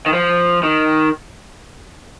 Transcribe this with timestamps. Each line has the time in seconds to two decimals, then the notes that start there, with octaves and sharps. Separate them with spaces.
0.06 D#3
0.13 F3
0.63 D#3